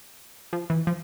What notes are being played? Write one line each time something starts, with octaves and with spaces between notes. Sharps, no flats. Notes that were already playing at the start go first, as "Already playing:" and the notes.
F3
E3
F3